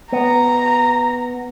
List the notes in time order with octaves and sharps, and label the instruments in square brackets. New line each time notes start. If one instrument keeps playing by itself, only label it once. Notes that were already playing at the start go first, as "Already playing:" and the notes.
[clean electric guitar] B3 [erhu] A#5